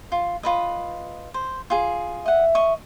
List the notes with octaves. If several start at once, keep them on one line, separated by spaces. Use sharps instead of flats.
F4
F4 B4 D#5
C5
F4 G#4
D#5 E5 F#5
D#5 C#6